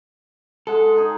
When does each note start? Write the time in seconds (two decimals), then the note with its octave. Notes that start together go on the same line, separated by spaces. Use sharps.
0.67 G#3 A4 F#5
0.96 D#4 G#4